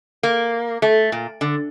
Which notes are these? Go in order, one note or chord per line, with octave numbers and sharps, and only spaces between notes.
A#3
A3
A#2
D3